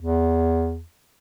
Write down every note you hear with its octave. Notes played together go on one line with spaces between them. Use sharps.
E2